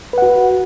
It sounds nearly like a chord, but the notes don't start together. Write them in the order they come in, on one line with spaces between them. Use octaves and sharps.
B4 F#5 F#4